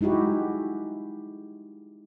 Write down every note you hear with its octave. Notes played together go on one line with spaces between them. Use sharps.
G#3 D#4 E4 F#4 G4